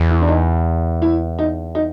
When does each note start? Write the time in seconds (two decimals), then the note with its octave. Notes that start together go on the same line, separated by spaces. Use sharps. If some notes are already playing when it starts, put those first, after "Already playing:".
Already playing: E2
0.10 E4
0.21 D4
0.28 D#4
1.02 E4
1.39 D#4
1.75 D#4